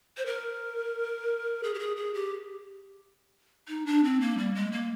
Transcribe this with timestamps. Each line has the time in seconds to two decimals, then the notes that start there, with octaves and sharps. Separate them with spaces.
0.17 C5
0.26 A#4
1.63 G#4
1.74 G4
1.79 G#4
1.96 G#4
2.14 G4
3.68 D#4
3.86 D4
4.04 C4
4.21 A#3
4.38 G3
4.55 G#3
4.72 A#3